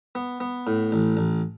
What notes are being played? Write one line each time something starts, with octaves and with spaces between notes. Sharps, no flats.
B3
B3
A2
A1
A1